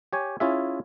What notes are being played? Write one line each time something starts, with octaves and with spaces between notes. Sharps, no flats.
G4 C#5 G#5
C#4 E4 F4 G#4 E5